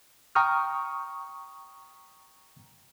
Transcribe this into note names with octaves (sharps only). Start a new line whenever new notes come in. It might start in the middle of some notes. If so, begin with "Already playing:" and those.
G5 A#5 C#6 D#6 F6